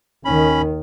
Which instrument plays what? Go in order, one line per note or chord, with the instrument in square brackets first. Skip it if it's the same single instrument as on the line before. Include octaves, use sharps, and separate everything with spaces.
[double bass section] D#2 D#3 [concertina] C#4 B5